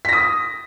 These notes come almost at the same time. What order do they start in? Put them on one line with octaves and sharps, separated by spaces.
B6 A#6 D#6